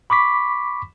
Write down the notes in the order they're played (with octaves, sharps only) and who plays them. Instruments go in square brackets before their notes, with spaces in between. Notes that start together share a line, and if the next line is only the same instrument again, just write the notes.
[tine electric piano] B5 C#6 D6 B6